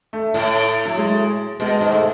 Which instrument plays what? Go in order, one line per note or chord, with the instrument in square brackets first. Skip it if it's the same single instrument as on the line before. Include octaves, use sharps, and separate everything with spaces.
[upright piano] A3
[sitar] A2
[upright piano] F#3
G#3
[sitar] B2 [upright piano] G#3
[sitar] G#2
[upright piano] A3